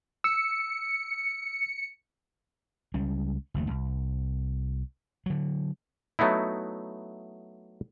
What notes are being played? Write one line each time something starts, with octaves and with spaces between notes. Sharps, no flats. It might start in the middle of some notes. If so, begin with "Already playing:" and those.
E6 C#7
C#2 G3 G#3 C#4
F#1 D#2 A3
C2
D3 F#3
F#3 A3 B3 D#4 E4